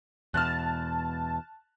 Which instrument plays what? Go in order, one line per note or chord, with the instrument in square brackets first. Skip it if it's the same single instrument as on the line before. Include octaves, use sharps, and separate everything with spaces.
[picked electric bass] E2 B2 [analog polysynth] A5 [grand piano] F6 F#6